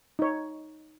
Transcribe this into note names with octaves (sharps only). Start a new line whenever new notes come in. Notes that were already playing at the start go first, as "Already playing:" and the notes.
D#4 C#5